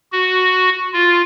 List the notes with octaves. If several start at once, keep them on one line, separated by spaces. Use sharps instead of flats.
F#4
F4